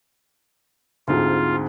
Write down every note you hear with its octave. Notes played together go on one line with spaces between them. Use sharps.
D2 G#2 C4 F4